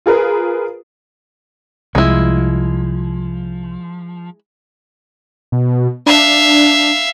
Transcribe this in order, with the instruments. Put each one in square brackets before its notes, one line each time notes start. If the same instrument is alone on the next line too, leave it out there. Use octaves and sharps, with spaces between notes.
[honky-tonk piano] F4 G#4 A#4 B4
[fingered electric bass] C2 [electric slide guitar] F3 [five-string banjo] G#3 E4
[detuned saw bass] B2
[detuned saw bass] D4 [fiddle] E5 F5